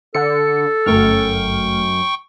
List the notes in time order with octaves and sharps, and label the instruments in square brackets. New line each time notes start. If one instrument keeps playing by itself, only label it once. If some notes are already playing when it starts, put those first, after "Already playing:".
[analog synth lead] D3 [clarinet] A4 [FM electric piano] C#7
[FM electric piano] G1 A3 F6 [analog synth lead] F#2 [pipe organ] G5 C#6